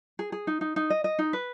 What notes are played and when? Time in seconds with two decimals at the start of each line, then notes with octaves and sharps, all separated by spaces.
0.19 G#4
0.32 G#4
0.47 D#4
0.61 D#4
0.76 D#4
0.90 D#5
1.04 D#5
1.19 D#4
1.33 B4